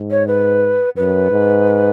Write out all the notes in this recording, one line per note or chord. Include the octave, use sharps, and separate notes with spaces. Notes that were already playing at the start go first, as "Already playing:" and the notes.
Already playing: G#2
C#5
B4
F#2 B4
G#2